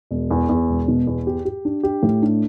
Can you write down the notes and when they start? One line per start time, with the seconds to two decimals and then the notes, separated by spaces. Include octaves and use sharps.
0.11 E1
0.31 E2
0.49 E2
0.69 E1
0.88 B2
1.07 E2
1.27 G4
1.45 G4
1.65 D4
1.83 G4
2.03 A2
2.22 D4